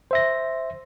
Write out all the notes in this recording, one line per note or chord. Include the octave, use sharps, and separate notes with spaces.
C5 E5 A#6